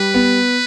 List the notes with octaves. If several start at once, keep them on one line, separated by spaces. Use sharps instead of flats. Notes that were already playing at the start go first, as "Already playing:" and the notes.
Already playing: G3 B4
B3